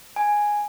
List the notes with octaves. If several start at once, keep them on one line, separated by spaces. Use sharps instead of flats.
G#5